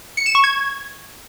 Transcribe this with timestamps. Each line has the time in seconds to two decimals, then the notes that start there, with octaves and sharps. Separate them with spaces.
0.17 C#7
0.26 E7
0.35 C#6
0.44 G#6